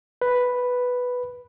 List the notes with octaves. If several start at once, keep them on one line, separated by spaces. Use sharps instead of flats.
B4